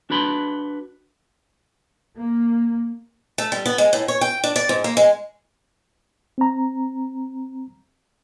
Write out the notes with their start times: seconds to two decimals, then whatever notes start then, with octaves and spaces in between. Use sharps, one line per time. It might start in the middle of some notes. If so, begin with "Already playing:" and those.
0.10 D4 F#4 B4 B5 C6
2.16 A#3
3.38 A3
3.52 G3
3.66 B3
3.78 G#3
3.93 A2
4.08 C#5
4.21 G5
4.44 D4
4.56 D5
4.69 G#2
4.84 A#3
4.97 G#3
6.38 C4 A#5